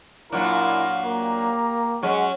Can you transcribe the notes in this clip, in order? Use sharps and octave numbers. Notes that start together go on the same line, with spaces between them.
A#2 F#3 D4 E4 F4 A#4
A#3 G4 A#5
F#3 G#3 C#4